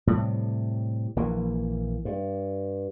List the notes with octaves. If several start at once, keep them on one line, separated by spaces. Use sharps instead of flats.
A2 C3 G3
A#1 E3 A#3
G2